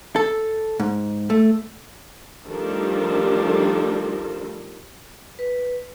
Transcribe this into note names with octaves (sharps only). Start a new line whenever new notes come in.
A4
G#2
A3
D#3 F3 G3 A3 D4 A4
B4